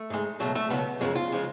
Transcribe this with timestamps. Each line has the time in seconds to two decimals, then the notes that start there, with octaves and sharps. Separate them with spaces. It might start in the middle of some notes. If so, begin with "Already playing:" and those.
Already playing: A3
0.10 G#2 G#3
0.40 C#2 B2 F#3 A3
0.55 A3
0.70 C#2 B2 F#3 B3
1.01 F#2 C#3 F3 G#3
1.15 F4
1.32 C#3 F3 G#3